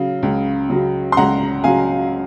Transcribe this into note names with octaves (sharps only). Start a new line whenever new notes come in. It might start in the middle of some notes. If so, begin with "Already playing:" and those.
Already playing: C#3 F#3 F5
C#2
C#3 F#3
C6
C#2 F#5 A#5
C#3 F#3 F5 G#5